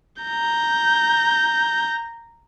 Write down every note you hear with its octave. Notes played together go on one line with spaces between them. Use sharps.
A#5 G6